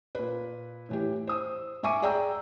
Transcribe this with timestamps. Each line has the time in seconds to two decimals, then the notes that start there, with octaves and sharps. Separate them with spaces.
0.15 A#2 B4
0.89 A2 E3 G4
1.27 C5 D#6 E6
1.83 G#2 E5 G#5 C#6 D6 D#7
2.02 G#4 D5 G5 A#5 E6 G6